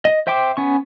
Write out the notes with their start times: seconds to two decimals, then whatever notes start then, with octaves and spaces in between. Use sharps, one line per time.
0.05 D#5
0.27 C5 E5 G5 C6 D6
0.57 B3 C#4 C#6